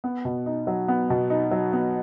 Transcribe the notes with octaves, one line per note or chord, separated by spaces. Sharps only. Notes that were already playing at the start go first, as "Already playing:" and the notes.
B3
B2
D#4
F#3
B3
B2
D#4
F#3
B3